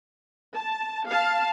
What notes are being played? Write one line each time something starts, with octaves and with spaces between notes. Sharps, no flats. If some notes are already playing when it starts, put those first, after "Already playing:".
A5
F5 A5